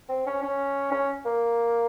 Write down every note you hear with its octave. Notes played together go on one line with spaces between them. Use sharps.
C4
C#4
C#4
C#4
A#3